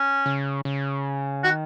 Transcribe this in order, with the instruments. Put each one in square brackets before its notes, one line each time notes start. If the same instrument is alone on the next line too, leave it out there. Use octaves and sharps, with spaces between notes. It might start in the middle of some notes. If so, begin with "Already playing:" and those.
Already playing: [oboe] C#4
[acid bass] C#3
C#3
[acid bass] D#3 [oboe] F#4